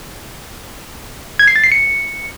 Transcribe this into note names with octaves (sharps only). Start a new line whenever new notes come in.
G#6
C7
A6
C7
C#7